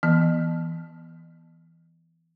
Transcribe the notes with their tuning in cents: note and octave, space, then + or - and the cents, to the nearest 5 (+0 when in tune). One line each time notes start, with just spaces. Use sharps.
E3 +10 B3 -15